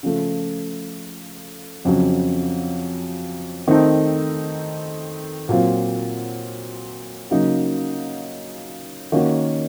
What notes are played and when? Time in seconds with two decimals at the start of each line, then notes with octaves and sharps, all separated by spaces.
0.03 C#3 F3 A3
1.85 F2 C#3 F#3
3.67 D#3 A3 C4 D#4 A4
5.49 A#2 F#3 C4 F4
7.31 C#3 F#3 A#3 D#4
9.12 D#3 A#3 C#4 F#4